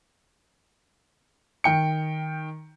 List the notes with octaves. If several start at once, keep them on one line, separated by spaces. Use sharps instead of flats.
D#3 G5 C#7